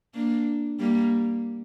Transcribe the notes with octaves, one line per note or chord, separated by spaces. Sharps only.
A#3 D4
G3 A#3